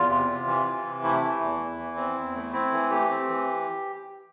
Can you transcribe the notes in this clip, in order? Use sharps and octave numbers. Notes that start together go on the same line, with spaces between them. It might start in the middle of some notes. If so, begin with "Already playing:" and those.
Already playing: E2 F4
C3
C3
E3
E3
C3
A3 E4
E3
E2
E2
E3
C4
E2
A3
C4 E4
E3
A3 G4
C4
E3